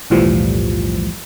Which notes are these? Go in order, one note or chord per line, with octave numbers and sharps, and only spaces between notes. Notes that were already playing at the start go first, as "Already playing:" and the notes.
B1 E2 A2 E3 F3 G3